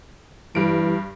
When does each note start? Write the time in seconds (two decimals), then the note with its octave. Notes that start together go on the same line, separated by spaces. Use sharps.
0.55 G2 E3 D7